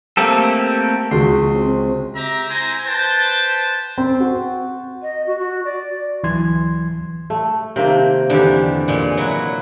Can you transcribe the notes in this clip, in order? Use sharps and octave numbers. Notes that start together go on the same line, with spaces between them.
A3 A#3 C4 G4 A4
C#2 F#4 C6
C4
G4 E5 A#5
E4 C5 G#5 A#5
B4 C5 G5 A5
C4
F#4
D#5
F#4
F#4
D5
D2 E3 F#3 C6 G#6
A3
C3 D#3 A#3 C4
E2 D3 D#4 G4
A#2 G#3
F#3 E4 F#4